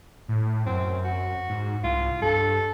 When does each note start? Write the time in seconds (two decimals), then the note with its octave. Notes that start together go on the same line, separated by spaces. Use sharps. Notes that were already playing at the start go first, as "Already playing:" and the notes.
0.28 A2
0.66 F#2 C4
1.04 F#4
1.49 G#2
1.84 C2 F4
2.22 G2 A4